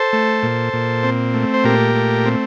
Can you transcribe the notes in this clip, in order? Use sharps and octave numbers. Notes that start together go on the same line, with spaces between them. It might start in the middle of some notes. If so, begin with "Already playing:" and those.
Already playing: A4 C5
A3
A#2
A#2
C4
A3
C5
A#2 G4 A#4
A3
C4